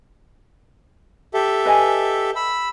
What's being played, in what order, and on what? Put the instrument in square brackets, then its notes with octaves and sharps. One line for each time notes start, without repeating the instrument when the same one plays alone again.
[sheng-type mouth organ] G4 A4 E5
[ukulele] B4 D#5 G#5
[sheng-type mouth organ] B5 E6